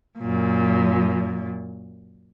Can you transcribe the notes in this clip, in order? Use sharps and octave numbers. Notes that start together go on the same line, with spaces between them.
F#2 A#2